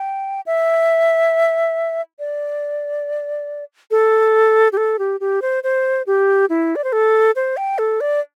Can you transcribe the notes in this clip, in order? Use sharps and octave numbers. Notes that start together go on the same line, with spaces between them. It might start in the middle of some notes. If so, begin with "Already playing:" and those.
Already playing: G5
E5
D5
A4
G4
A4
G4
G4
C5
C5
G4
E4
D5
C5
A4
C5
G5
A4
D5